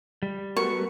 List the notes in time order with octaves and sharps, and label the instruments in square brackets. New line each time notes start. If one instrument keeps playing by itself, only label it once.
[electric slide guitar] G3
[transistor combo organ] A3 B3 F#4 [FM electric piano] A#4 C#7 [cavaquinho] C#6